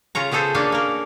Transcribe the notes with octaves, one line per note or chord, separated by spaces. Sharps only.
C#3 F4 C#5 A#5
C#3 B3 G#4 A4 C5
A#3 C#4 D4 F#4 C#5 F5
A#3 A#4